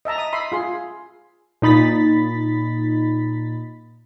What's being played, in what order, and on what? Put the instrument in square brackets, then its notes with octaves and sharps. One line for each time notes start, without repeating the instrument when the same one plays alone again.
[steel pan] D#5 E5 A5 A#5
D#6
E5 B5 C6
F4 G#4 C6
[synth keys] A#2 D#4 B5 A6 B6